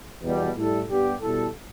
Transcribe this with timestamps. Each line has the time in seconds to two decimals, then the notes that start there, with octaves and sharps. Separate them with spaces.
0.23 E2 B2 G3
0.56 A2 G3 E4 A4
0.88 G2 G3 B3 G4
1.21 B2 G3 E4 A4